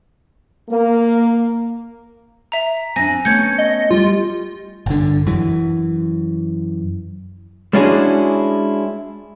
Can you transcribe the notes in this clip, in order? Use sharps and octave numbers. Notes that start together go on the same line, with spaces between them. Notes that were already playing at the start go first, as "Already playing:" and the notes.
A#3
E5 A#5
C4 D4 G#5 A#6
A3 B3 C#4 G6 G#6 C#7
D#5
G3 F4
G1 D3
F#2 E3
G#3 C#4 D4 E4 F#4 G#4